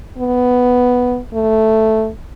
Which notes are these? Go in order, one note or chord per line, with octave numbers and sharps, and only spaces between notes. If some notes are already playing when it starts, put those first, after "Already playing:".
B3
A3